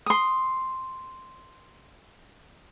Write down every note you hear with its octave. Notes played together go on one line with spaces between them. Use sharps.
C6 D#6